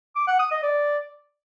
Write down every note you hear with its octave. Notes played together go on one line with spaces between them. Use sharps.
D6
F#5
D#6
D#5
D5